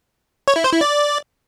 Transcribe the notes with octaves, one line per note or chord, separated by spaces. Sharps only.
C#5
E4
C5
E4
D5